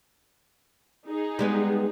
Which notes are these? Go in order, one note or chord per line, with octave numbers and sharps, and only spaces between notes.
D#4 G#4
G3 G#3 B3